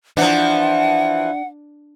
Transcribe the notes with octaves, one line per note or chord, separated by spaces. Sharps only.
E3 F3 D4 F#5